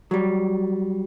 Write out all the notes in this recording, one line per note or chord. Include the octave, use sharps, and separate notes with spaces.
F#3 G3